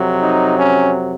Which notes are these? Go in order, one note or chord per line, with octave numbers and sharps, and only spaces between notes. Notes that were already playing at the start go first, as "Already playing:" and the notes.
Already playing: F2 C3 F#3
D#4
C#4